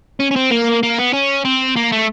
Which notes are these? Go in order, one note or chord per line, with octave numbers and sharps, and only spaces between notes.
C#4
C#4
C4
A#3
A#3
B3
C#4
C4
A#3
A3